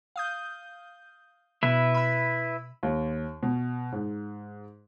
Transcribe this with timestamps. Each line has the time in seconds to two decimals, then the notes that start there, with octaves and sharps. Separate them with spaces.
0.16 F5 D#6 G6
1.63 B2 E4 B4 E5
1.94 B5 E6
2.83 D#2
3.43 B2
3.92 G#2